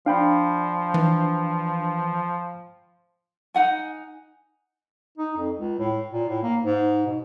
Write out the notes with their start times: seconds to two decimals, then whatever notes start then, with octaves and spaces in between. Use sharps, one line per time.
0.06 F3 D4 F5 G5 B5
0.94 E3
3.54 D#4 F#5 G#5
5.18 D#4
5.37 F2
5.56 C#2
5.79 A2
6.11 A#2
6.29 A2
6.43 A#3
6.61 G#2
7.06 B2